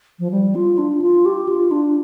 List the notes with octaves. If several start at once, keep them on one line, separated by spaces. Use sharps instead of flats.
F3
G3
F4
D4
F4
G4
F4
D4